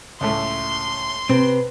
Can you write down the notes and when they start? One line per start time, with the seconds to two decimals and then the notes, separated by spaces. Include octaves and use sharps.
0.21 C#2 A2 A3 C6
1.30 C3 C4 B4